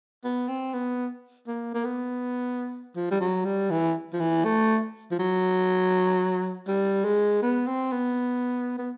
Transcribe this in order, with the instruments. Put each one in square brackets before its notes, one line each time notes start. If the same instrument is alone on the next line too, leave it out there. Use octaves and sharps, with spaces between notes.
[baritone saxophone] B3
C4
B3
A#3
A#3
B3
F3
G3
F#3
G3
E3
F3
E3
A3
F3
F#3
G3
G#3
B3
C4
B3
B3